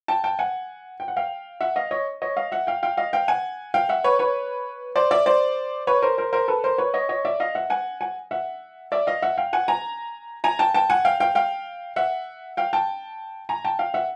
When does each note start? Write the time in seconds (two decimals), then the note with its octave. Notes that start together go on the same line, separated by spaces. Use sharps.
0.08 G5 A5
0.24 G5 A5
0.39 F#5 G#5
1.00 G5
1.08 F#5
1.17 F5 G5
1.61 E5 F#5
1.76 D#5 F5
1.91 C#5 D#5
2.22 C#5 D#5
2.37 D#5 F5
2.52 E5 F#5
2.67 F5 G5
2.83 F5 G5
2.97 D#5 F5
3.13 F5 G5
3.28 F#5 G#5
3.74 F5 G5
3.89 E5 F#5
4.04 B4 C#5
4.19 B4 C#5
4.96 C5 D5
5.11 D5 E5
5.26 C5 D5
5.87 B4 C#5
6.02 A#4 C5
6.18 A#4 C5
6.33 A#4 C5
6.48 A4 B4
6.64 A#4 C5
6.78 B4 C#5
6.94 C#5 D#5
7.09 C#5 D#5
7.25 D5 E5
7.40 D#5 F5
7.55 E5 F#5
7.70 F#5 G#5
8.01 F#5 G#5
8.31 E5 F#5
8.92 D5 E5
9.07 D#5 F5
9.22 E5 F#5
9.38 F5 G5
9.53 F#5 G#5
9.68 G#5 A#5
10.44 G#5 A#5
10.59 G5 A5
10.74 G5 A5
10.90 F#5 G#5
11.05 F5 G5
11.20 F5 G5
11.35 F5 G5
11.96 E5 F#5
12.57 F5 G5
12.73 G5 A5
13.49 G#5 A#5
13.64 G5 A5
13.79 F5 G5
13.94 E5 F#5